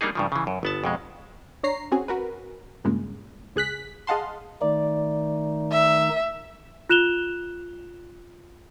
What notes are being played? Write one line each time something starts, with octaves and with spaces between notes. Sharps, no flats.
G3 A#3 D4 D#4 G#4
G2 C#3 F3
C#3 E3
F#2
G1 B3 A5
F2 B2 G#3
D4 C#5 A#5 C7
C4 C#4 F#4 G#4
F#4 A#4 B4
G2 A#2 C#3 G#3
C#2 G#4 F#6 B6
G#4 D#5 F5 F#5 A5 C6
D#3 A3 D#4 D5
E5
F4 F#6 E7 F7 G7